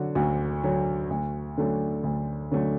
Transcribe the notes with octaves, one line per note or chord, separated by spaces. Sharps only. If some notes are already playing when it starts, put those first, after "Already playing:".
Already playing: D3 F#3 F#4
D2 F#4
D3 F#3
D2
D3 F#3 A3
D2
D3 F#3 A3